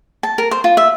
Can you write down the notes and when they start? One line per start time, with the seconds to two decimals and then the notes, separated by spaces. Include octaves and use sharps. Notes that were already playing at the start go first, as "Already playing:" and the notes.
0.23 A5
0.38 A#4
0.51 C5
0.64 F4
0.77 E5